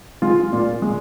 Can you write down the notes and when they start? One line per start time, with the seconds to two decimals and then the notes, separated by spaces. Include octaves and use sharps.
0.22 G#3 F4
0.53 A#2
0.82 G#3